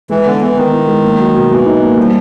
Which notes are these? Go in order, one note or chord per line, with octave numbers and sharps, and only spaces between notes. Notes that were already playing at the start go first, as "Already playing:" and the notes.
E3 G#3
D3 B3
E3 B3
D#3 B3
E4
G#3
A#3
F#3
B2
B2 E3
D#4
A#3
F3 G3